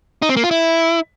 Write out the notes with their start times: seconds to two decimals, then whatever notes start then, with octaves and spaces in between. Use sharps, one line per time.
0.22 D#4
0.29 C4
0.37 A#3
0.44 F4
0.51 E4